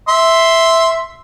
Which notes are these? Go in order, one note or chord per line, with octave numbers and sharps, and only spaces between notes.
E5 C6